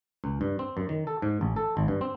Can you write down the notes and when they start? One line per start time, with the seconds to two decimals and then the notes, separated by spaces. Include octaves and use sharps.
0.24 C#2
0.41 G2
0.59 C4
0.77 F#2
0.89 D#3
1.07 A4
1.22 G#2
1.41 A1
1.56 A4
1.77 G#1
1.88 G2
2.01 C4